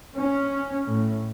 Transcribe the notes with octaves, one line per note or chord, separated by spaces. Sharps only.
C#4
A2